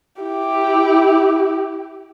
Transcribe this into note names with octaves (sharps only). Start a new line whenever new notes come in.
E4 G4